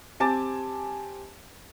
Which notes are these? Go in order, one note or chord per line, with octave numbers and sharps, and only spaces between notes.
C4 G4 G#5 A5 D6 A6